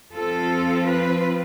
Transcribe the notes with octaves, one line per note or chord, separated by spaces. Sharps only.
F3 C4 F4 A4
B4